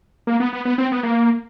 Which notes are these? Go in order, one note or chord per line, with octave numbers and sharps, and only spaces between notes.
A#3
B3
B3
B3
C4
B3
A#3